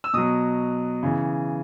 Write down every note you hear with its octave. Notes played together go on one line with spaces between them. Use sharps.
E6
B2 F#3 D#6
C#3 E3